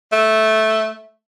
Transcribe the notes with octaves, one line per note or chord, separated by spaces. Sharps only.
A3